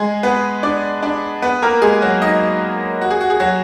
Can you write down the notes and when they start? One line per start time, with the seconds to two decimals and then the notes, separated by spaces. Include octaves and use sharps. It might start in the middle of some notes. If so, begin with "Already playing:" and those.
Already playing: G#3 G#4
0.23 B3 B4
0.63 D4 D5
1.02 D4 D5
1.42 B3 B4
1.62 A#3 A#4
1.82 G#3 G#4
2.02 F#3 F#4
2.22 D#4 D#5
3.01 F#4
3.11 G#4
3.21 F#4
3.30 G#4
3.40 F#3 F#4